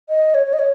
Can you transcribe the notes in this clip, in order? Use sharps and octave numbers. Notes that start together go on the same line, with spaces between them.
D#5
C#5
C#5
D#5
C#5